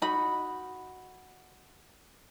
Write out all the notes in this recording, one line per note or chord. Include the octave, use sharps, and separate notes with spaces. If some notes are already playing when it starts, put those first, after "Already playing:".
D#4 F#4 B5